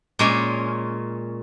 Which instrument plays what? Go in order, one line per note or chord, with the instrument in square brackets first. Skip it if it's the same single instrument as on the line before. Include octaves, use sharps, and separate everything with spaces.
[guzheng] A#2 G#3 C#4